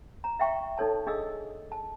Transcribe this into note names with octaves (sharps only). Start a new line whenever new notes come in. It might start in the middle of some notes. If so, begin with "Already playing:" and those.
A#5
E5 F5 G5 C#6
D#4 A4 C#5 A5
D4 G#4 D#5 F5 D#6 E6
A5